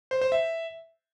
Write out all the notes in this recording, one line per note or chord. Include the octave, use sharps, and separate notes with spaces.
C5
C5
E5